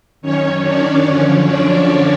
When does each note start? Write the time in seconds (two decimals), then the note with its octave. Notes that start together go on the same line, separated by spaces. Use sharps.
0.21 F#2 D#3 C#4 C#5
0.63 D4 D5
1.04 F#2 D3 F3 C#4 C#5
1.45 D4 D5